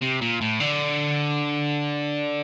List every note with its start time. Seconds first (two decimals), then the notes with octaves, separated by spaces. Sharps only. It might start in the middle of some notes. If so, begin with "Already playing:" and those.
0.02 C3
0.21 A#2
0.41 A2
0.60 D3